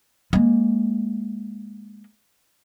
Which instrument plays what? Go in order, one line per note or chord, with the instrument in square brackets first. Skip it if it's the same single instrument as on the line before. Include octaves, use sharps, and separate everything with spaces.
[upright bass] G#3 A#3